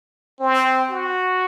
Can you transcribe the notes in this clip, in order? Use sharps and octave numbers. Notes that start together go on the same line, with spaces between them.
C4
F#4